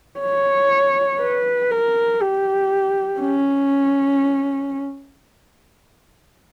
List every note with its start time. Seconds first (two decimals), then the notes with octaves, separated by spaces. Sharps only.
0.20 C#5
1.20 B4
1.71 A#4
2.21 G4
3.21 C#4